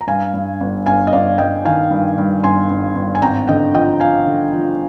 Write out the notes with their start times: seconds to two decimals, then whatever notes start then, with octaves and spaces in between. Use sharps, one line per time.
0.01 A#5
0.07 G2 F5 G#5
0.34 G2
0.60 G1
0.86 G1 F5 G#5
1.07 D#5
1.13 G1 D5 F5
1.38 G1 D#5 G5
1.65 D#3 F5 G#5
1.90 G2
2.18 G2
2.43 G1 G#5 C6
2.70 G1
2.95 G1
3.15 G#5
3.22 G#1 G5 A#5
3.47 D3 D#5 G5
3.74 F3 D#5 G5
4.00 F3 F5 G#5
4.27 D3
4.53 F3